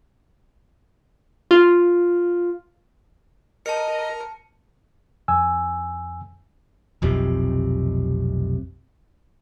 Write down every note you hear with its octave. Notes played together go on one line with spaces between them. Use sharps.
F4
A#4 D#5 A5 C#7
F2 G#5 E6
F1 B1 F2 C3